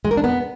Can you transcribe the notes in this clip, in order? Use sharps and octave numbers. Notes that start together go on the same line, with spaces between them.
G#3
A#4
D4
B3